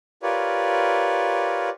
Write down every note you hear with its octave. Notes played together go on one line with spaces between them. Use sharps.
F4 G4 A#4 B4 C#5 D5